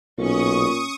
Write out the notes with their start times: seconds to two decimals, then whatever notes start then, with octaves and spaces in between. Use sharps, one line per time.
0.18 B1 A#2 C#4 C#6 D#6